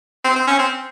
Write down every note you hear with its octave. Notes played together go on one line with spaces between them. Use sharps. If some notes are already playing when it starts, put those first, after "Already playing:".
C4
C4
C#4
C4